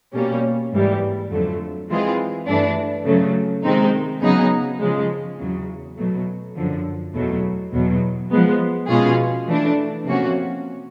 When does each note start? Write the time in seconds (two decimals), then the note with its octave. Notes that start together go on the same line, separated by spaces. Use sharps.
0.13 B2 G3 A#3 C#4
0.72 G#2 E3 G3 A#3
1.31 F2 D3 F#3 A3
1.89 E3 G#3 C4 F4 G#4
2.47 G2 E3 A3 D4
3.05 C#3 F#3 A3
3.64 C3 D#3 G#3 C4 D#4
4.22 C#3 F#3 B3 D#4 G#4
4.80 C#3 F3 G#3
5.39 E2 C#3 F#3
5.97 B2 F#3 A3
6.55 F#2 D3 F3
7.14 E2 B2 F#3 A3
7.72 E2 B2 F#3
8.30 F3 G#3 B3
8.88 B2 G#3 C#4 F4 G#4
9.47 E3 A3 D4
10.05 C3 F3 A#3 C#4 F#4